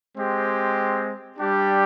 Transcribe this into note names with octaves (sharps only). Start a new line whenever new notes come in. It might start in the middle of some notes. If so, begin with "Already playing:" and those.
G#3 C4 G4
G3 D4 G4